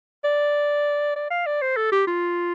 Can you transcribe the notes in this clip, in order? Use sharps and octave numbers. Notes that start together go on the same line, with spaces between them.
D5
D5
F5
D5
C5
A4
G4
F4